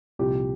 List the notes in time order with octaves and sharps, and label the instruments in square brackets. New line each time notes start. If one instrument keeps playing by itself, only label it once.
[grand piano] C2 A#2 F3 G4